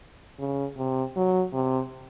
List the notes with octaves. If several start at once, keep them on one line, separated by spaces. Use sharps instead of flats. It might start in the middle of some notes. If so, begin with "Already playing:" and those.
C#3
C3
F#3
C3